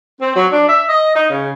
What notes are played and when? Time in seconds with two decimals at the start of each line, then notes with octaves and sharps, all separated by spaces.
0.21 C4
0.36 F#3
0.52 D4
0.68 E5
0.89 D#5
1.15 D#4
1.30 C#3